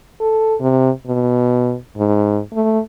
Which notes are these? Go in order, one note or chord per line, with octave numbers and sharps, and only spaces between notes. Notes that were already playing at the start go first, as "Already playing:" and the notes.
A4
C3
B2
G#2
A3